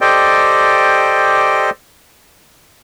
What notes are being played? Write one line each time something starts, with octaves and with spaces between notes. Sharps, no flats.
G4 A4 C5 D5 D#5 G5